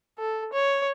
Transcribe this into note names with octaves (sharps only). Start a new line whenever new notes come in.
A4
C#5